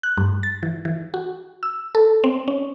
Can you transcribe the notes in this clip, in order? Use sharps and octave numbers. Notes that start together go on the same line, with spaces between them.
F#6
G2
A6
E3
E3
F#4
E6
A4
C4
C#4